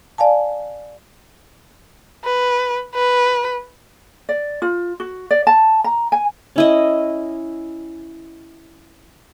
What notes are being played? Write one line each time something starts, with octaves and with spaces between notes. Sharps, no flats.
D5 F5 G#5 A5
B4
B4
D5
F4
F#4
D5
A5
A#5
G#5
C#4 E4 D#5